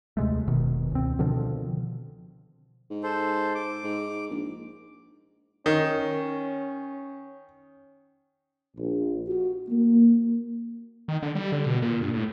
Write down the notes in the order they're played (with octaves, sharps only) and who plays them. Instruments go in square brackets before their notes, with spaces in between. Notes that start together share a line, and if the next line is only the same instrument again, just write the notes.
[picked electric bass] D#2 C3 G#3 A3
E1 B2 D#3
C#2 C4
B2 D3 D#3 F3
[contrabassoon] G#2
[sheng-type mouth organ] A4 C5
D6
[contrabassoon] G#2
A#1
[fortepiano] D#3 [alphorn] C#4
[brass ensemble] A#1
F#4
A#3
[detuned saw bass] D#3
D3
G3
D3
B2
A#2
G2
A2